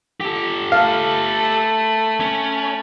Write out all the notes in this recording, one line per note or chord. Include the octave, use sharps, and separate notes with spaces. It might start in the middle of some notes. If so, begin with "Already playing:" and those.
G4 A4
A3 F5 B5
C#4